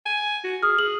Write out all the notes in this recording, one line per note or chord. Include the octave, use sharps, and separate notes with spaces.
G#5
F#4
G#4 D#6 F6
G#4 F#7